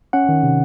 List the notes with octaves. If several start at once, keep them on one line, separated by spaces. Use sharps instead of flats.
C#4 F#5
D#3
C3